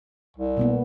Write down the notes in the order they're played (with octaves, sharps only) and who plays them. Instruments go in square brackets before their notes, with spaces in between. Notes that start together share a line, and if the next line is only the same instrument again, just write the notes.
[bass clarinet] C2
[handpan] B2 A#3 B3